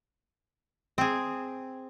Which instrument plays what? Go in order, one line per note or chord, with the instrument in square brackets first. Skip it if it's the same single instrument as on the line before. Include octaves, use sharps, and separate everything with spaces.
[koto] C4 G#4